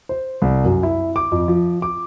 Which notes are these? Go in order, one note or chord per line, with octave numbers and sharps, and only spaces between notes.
C5
C2
F#2
E4
D6
F2
F3
D6